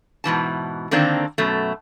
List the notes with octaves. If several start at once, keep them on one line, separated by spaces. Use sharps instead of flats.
G#2 B2 E3 A5
D3 D#3 A#3 C4 D4
F#2 B2 A3